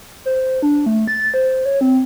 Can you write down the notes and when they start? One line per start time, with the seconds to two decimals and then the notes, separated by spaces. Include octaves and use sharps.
0.26 C5
0.62 D4
0.86 A3
1.08 A6
1.34 C5
1.65 C#5
1.81 C4